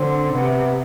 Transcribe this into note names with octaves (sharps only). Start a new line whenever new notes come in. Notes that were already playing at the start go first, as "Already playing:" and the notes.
Already playing: D3 C4
C3 B3